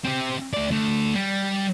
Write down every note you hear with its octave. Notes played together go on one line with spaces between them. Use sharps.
C4 G4
A3 D5
D3 A3
G3